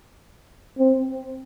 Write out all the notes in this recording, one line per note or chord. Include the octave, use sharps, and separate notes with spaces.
C4